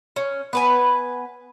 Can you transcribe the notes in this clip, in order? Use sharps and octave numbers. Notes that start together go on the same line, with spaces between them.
C#4
B3 B4 G#5